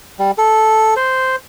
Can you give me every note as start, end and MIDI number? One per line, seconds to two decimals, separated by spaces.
0.19 0.31 55
0.38 0.94 69
0.96 1.36 72